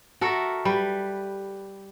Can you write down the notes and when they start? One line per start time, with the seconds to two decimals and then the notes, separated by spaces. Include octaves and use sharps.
0.21 F#4 A4 A#4 E5
0.65 G3 B4